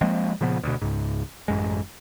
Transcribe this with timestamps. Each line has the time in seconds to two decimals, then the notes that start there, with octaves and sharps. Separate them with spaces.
0.01 F3 G#3 A#3 C4
0.41 A#2 C#3 F3 B3
0.63 D2 B2
0.82 C#2 G#2
1.48 A1 F#2 G#3